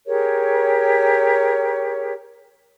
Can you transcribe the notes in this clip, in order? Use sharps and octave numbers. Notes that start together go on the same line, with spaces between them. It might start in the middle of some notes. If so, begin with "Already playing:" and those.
G4 G#4 A#4 C#5